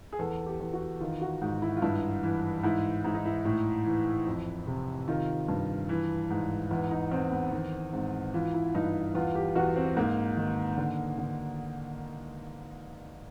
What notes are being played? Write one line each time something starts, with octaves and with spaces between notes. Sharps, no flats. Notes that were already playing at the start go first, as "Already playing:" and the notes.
G#4
E2 A4
G4
E2
F#4
D#3 F4
F#4
G#2
E4
F4
G2 E4
E3
G#2 E4
G#2 E4
D#4
E4
A2
E3
F2
C3
D#3 F4
G2
E3
G#2
E2 E4
D#4
E2 C4
B3
D#3 C4
G#2 C4
E3 F4
E4
G2 D#4
E2 F4
G4
E2 F#4
C4
G#2 A#3
D#3
D3
D3